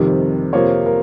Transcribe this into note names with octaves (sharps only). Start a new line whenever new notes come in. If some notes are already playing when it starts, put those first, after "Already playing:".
Already playing: F2 C3 D#3 G3
F2 C3 F3 A#3 C#5
A#4